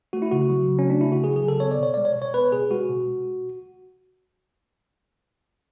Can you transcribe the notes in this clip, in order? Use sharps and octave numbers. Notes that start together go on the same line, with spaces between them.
A3 F#4
E4
C#3 F#4
F#3
C#3
C#4
A3 D4
C#3 E4
F#4
F#3 G#4
G#4
C#3
A4
B3 C#5
D5
B2 C#5
G#3 D5
C#5
B2
C#5
B3 B4
B2 G#4
G#3 F#4
B2